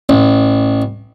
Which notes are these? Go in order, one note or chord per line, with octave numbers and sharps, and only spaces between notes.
A1